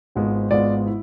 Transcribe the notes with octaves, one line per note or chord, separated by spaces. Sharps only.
G#1 G#2 G#3 B3 F4
G#1 G#2 G#3 B3 F4 D5
E4